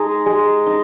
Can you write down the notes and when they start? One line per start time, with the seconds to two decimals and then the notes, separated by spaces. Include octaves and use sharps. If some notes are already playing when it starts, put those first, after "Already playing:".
Already playing: G#3 D#4 G#4
0.26 G#3
0.67 D#4